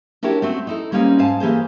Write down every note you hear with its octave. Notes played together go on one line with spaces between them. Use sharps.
D4 E4 F#4 G4 A#4 C#5
A3 C4 F#4
D#4 E4 A4
G3 A#3 C4 C#4 D#4
G#2 F5 G#5 A5
E3 A#3 G4 G#4 C5